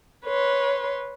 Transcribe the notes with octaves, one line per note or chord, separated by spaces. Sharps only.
B4 C#5 C6